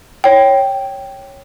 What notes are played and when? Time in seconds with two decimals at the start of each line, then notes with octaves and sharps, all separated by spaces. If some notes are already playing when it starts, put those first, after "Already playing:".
0.24 C#5 G5